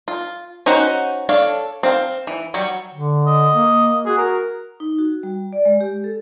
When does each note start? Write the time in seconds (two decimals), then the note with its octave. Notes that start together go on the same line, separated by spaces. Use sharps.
0.08 F4
0.66 C#4 D#4 F#4 C5 F#5
1.29 D4 A4 C#5 F5
1.83 C4 F5
2.27 E3
2.54 F#3 G3 C#5
2.94 D3
3.27 D#5
3.54 A#3
4.06 F#4 G#4
4.18 A#4
4.80 D#4
4.98 F#4
5.23 G3
5.53 D5
5.65 G#3
5.81 G4
6.04 A4